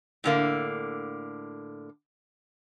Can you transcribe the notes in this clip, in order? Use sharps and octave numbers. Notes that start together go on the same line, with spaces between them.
A2 D3 A#3